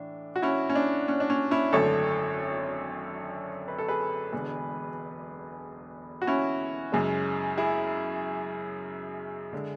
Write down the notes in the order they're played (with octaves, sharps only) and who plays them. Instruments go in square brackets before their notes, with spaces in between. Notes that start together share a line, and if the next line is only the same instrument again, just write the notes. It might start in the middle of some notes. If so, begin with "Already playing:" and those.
Already playing: [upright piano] A2 E3 D4
F#4
C#4 E4
C#4
D4
C#4
D4
C#4
C#4 E4
G#1 F#2 D3 A3 A4 C#5
B4
A4
G#4 B4
E1 E2 D3 G#3
F#4
C#4 E4
F#2 C#3 G#3
E4 G#4
D3 G#3